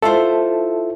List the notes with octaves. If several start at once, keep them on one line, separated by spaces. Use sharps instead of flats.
E4 F4 A4 C5 E5